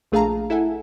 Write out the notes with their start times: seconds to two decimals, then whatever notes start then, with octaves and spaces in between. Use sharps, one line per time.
0.12 A#1 A3 G#4 F5 A5 A#5
0.50 E4 A4 E5 F#5 G#5